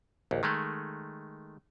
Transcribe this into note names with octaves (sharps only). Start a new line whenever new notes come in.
A#1 D#2
D#3 G#3 A3